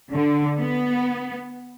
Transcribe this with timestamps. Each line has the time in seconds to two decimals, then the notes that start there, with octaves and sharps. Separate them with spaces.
0.12 D3
0.58 B3